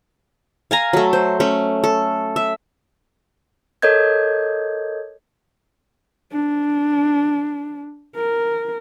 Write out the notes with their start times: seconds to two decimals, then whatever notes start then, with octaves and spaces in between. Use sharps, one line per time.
0.71 F5 G#5 A#5
0.93 F#3 A3
1.13 C5
1.40 A3 C#4
1.84 A4
2.36 E5
3.82 A4 A#4 C#5 D#5 G6 G#6
6.32 D4
8.16 A#4